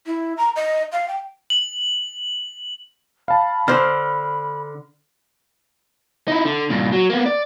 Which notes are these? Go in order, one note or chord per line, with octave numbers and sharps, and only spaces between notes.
E4
A#5
D#5
F5
G5
F#7
F5 A5 B5
D3 C5 F6
D#4 E4
D3
G2 A#2
F#3
A#3 B3
D5